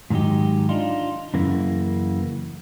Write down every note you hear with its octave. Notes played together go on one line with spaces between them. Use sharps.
G#2 D#3 F#3 D#4 G4
D4 D#4 F4
F#2 C#3 E3 A#3